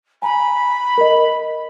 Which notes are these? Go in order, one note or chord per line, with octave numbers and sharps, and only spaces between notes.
G#5 A#5 B5
A#4 D#5